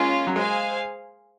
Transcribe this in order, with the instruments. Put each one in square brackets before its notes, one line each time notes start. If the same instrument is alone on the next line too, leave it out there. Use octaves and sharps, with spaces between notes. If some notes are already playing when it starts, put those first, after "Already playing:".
Already playing: [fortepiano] G#3 [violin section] A#3 C#4 F4
[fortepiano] F#3
[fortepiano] G#3 [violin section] G#4 C5 F5 G#5